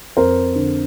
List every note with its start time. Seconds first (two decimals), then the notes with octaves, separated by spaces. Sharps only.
0.17 F2 A#4 C5
0.56 D3